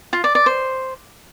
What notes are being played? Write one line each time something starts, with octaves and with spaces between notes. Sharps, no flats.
F4
D5
D5
C5